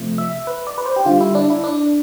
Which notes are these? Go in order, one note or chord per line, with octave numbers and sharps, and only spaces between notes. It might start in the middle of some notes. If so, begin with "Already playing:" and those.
Already playing: C3 F3 A3
E5
B4
D5
B4
C5
G4
D3 G3 F4
E4
D4
E4
D4